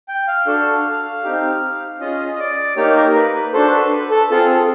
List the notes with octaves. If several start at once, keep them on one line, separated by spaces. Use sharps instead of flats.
G5
F5
D4 F#4 A4
C4 D#4 G4
C#4 F4 G#4 D#5
D#5
D5
A#3 D#4 G4 C#5
A#4
B4
B4
D4 F#4 A4 C5
B4
B4
A4
C4 F4 G#4 A4